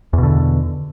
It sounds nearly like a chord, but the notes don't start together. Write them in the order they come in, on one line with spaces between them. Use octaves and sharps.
E2 B2 D3